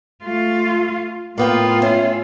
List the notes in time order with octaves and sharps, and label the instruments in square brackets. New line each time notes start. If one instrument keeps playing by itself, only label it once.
[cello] A3 F4
[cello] A2 F4 [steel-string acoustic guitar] A#3 B3 G5
[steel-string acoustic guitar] C#4 E4